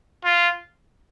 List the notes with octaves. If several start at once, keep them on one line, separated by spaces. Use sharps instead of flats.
F4